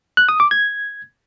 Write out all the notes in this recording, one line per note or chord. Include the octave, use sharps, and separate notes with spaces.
F#6
D#6
D6
G#6